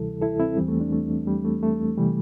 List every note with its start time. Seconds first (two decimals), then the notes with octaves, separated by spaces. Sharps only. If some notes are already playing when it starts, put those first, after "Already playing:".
Already playing: D2 C3 E3 G3 E4 A4
0.21 E4 A4
0.40 C4 E4
0.57 E2 E3 G3 C4
0.68 A3
0.80 A3 D4
0.92 A3
1.27 G3
1.45 A3
1.63 A3
1.98 C3 E3 G3